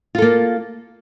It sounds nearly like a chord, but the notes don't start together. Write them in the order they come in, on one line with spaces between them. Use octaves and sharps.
F4 A4 A#3